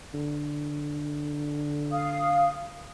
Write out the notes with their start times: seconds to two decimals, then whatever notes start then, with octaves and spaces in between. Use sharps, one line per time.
0.14 D3
1.92 F5 D#6